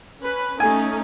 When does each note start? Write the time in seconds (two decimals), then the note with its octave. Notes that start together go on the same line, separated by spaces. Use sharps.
0.22 C#4 B4
0.60 A3 C#4 D#4 G#5